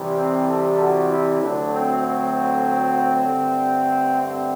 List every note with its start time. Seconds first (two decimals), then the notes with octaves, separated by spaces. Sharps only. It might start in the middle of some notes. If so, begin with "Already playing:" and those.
Already playing: C2 C3 E3 G3
0.17 C4
0.48 A4
0.79 F#4
1.10 E4
1.41 D2 D3 F#3 A3 D4
1.72 C4
2.03 C4
3.28 G2 D3 A3
4.21 C4